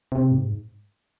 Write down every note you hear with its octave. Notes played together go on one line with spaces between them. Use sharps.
C3
G#2